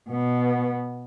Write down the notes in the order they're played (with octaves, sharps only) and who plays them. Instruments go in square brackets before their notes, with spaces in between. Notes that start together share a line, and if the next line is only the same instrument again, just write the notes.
[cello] B2 B3